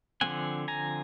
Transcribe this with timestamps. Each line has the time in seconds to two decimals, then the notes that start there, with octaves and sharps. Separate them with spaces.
0.21 D3 F3 A3 C4 F#5 G#5
0.68 G#5 A#5